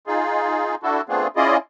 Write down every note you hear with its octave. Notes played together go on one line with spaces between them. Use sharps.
D#4 F4 G#4
D4 E4 F#4 A4
A3 B3 C4 D4 F4 G#4
C#4 E4 F4 G#4 D5 D#5